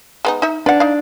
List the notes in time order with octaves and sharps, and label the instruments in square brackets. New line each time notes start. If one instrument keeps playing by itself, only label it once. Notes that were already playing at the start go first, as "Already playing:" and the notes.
[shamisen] G#3 B3 D#4
D#4 E5
[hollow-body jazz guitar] D4 [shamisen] B4 F#5
[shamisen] D#4 F5